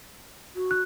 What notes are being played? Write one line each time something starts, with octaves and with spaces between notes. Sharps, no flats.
F#4
F#6